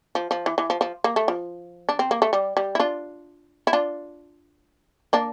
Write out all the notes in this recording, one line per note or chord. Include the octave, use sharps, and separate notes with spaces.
F3
F3
E3
E3
F3
F3
A#3
A3
F3
D4
C4
A#3
A3
G3
G3
E4
D4 F4
E4
D4 F4
A#3 D4